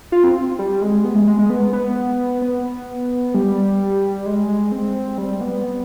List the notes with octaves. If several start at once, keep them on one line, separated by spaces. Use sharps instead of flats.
F4
C4
G3
G#3
B3
G#3
G#3
G#3
B3
B3
B3
G3
G#3
C4
G3
B3